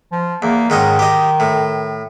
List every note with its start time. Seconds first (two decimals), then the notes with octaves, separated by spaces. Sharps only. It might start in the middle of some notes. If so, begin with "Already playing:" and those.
0.12 F3
0.42 E2 A#3
0.70 G#2 D#3 C#4 D#5
0.99 G4 D#5
1.40 A2